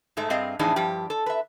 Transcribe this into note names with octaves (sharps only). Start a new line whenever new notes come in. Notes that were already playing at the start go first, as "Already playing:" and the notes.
G#2 G#3 A3
G2 C4 G#4 D#5 F5
F2 A2 E3 D4 D#4 G#4
G2 F3 G4
A4
B4 E5